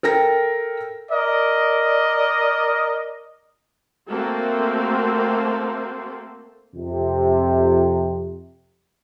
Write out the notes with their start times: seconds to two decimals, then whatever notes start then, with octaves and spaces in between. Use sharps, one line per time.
0.03 A4 A#4 G5 A#6
1.11 A#4 D5 D#5
4.09 A3 A#3 C4 F#4 A4
6.75 F2 C3